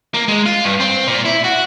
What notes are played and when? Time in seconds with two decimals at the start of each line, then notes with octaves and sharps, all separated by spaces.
0.14 A#3
0.28 G#3
0.46 F4
0.64 G2
0.80 C4
1.07 A#2
1.25 E4
1.44 F#4